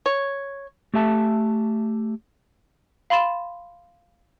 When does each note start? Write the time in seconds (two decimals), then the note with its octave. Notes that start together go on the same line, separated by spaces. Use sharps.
0.06 C#5
0.94 A3 G4 E5 A5
3.10 F5 B5 C6 A6 E7